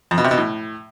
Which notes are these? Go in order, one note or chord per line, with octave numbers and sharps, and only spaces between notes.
F2
B2
C3
B2
A2